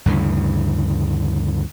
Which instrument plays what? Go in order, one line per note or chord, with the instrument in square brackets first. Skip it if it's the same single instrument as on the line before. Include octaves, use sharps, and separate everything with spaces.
[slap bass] D2 G2 C#3 E3